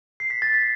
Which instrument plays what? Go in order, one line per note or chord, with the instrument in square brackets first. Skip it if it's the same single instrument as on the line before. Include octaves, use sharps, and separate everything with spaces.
[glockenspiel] C7
B6
A6
B6